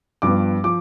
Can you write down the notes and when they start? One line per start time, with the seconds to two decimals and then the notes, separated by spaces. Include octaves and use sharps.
0.22 G2 F3 B3 D6
0.64 F3 D6